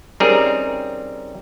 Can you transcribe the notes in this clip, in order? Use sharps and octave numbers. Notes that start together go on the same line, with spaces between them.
G3 C4 C#4 D#4 G#4 A#4